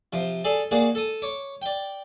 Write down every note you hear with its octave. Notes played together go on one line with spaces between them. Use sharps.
C3 F3
G#4 A4 D5
A#3 F#4 G#4 D5
A4 D#6
C#5 D6
D5 G5